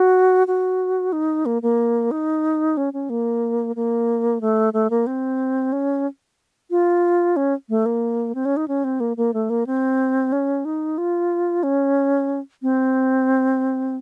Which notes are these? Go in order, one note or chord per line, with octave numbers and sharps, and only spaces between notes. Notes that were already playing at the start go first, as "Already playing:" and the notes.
Already playing: F#4
F#4
D#4
A#3
A#3
D#4
C#4
C#4
A#3
A#3
A3
A3
A#3
C4
C#4
F4
C#4
A3
A#3
C4
C#4
D#4
C#4
C4
A#3
A#3
A3
A#3
C4
C#4
D#4
F4
C#4
C4